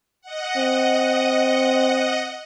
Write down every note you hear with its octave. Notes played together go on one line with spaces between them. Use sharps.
D#5 F#5
C4